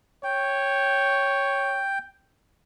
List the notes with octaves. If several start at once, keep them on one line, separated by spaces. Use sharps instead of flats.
C#5 G5